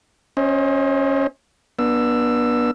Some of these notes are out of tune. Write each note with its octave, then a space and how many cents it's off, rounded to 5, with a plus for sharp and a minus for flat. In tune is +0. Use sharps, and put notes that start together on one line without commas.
C#4 -10 C5 +25 D#5 +30
B3 -35 D4 +10 E6 +15